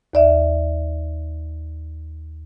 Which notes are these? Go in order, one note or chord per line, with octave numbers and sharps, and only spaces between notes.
D#2 D5 E5